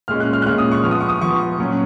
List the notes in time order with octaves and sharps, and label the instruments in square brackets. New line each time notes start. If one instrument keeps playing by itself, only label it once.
[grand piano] A#2 G#3 C#4 F6
F#6
F6
F#6
A#2 G#3 C#4 F6
D#6
C#6
F3 B3 F6
D#6
C#6
D#6
F3 B3 C#6
A#2 F#3 C#4